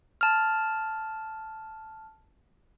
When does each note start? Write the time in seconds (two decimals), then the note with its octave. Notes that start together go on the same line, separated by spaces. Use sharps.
0.21 A5 F6